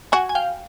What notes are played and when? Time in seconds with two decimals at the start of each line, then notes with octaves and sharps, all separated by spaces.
0.12 F#4 F#5 G#5
0.29 G#5
0.35 F5 G5